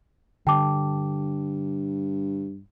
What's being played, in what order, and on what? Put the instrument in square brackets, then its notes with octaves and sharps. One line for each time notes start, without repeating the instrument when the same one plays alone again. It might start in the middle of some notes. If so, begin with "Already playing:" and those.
[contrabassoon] G2 [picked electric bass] D3 [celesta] G5 A5 D6